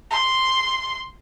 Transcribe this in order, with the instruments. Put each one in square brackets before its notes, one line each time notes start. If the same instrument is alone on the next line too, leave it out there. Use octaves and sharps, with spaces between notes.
[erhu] C6